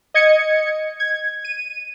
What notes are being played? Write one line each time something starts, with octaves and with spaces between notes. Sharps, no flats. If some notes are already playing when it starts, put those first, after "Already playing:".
D#5 G#6 C#7
G#6
D#7